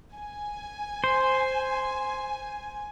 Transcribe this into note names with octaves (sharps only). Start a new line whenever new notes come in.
G#5
C5